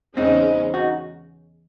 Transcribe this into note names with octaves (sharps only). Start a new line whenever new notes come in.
E2 C#3 G#3 C4 C#4 D#4
D#4 F#4